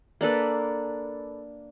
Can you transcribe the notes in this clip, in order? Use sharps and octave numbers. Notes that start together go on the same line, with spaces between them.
A#3 D4 A4 B4